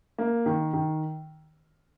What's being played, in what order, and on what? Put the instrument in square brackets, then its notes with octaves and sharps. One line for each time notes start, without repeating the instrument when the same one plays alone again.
[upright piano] A#3
D#3
D#3